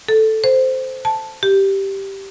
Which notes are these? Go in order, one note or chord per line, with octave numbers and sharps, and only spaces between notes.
A4
C5
A5
G4